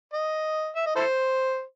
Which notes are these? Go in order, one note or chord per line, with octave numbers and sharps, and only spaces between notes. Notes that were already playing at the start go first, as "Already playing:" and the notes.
D#5
E5
D#5
E4 A4 C5